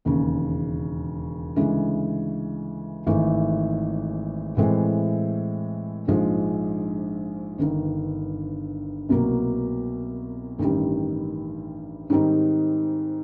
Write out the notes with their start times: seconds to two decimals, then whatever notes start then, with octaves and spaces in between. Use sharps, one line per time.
0.05 E1 D#2 C#3
1.56 D2 C#3 E3 G#3
3.07 G#1 G#2 E3 A3
4.57 A2 E3 G#3 C4
6.07 A#1 G#2 F3 G#3
7.58 G1 G2 D#3
9.09 C2 B2 F#3 A#3
10.59 A1 G2 D#3 G3
12.10 G#2 D#3 G3 C4 D#4